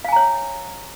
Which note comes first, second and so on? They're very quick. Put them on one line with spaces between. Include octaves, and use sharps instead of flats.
F5 G#5 A#5 C#5